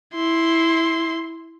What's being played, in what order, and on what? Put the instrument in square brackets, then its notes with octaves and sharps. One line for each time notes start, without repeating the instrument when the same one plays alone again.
[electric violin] E4 C6